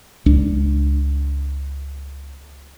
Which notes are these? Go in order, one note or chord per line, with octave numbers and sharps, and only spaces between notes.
C#2 D4